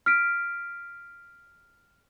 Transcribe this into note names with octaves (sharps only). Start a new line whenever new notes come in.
F6 B6 D7